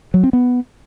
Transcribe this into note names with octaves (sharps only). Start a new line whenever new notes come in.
F#3
C4
B3